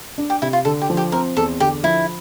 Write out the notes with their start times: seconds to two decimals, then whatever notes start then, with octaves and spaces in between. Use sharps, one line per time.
0.18 D4
0.30 G4
0.42 C3 E4
0.53 F4
0.65 D3 A4
0.81 G4
0.90 F3
0.97 G4
1.12 C4 A#4
1.37 E2 A4
1.60 D3 G4
1.83 F3 E4